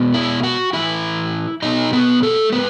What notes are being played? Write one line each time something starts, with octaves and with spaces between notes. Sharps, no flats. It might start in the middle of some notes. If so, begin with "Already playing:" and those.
Already playing: B2 G#3 B3
E4 E5
F#4 F#5
A2 E3 B3 E4 E5
B2 F#3 B3 D#4 D#5
B3 B4
A3 A4
A2 G#3 B3 B4